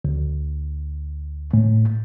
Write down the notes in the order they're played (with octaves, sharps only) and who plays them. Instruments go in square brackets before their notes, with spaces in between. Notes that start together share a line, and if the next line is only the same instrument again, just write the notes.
[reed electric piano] D2
A2